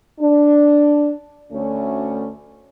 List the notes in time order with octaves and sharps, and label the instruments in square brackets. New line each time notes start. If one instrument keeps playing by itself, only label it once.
[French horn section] D4
D2 A3 C#4